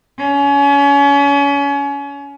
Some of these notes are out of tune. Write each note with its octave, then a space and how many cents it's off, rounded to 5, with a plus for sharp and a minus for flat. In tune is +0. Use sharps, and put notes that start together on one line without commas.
C#4 +30